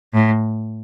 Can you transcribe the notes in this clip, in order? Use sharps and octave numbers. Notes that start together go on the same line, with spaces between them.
A2